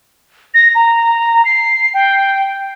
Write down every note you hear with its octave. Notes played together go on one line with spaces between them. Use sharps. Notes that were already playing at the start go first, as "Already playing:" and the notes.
A#6
A#5
C7
G5